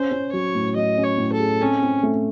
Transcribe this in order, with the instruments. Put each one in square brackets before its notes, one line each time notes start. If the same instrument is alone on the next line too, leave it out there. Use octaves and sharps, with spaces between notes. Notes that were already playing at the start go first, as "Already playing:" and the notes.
Already playing: [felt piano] C#4 [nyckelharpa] C5
[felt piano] C#4
[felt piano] F#3 [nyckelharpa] C#5
[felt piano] A2
[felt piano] F#3 [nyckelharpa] D#5
[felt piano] C#4
[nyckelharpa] C#5
[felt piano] A2
[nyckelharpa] A4
[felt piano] G#4
[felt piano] C4 [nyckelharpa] C#4
[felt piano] C4
A3